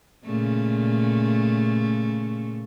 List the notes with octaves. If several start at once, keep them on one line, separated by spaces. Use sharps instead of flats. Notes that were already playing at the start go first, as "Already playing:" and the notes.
A#2 C#3 A3